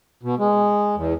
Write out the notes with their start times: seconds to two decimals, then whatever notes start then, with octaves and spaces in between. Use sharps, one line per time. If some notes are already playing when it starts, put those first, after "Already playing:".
0.23 B2
0.39 G#3
0.96 E2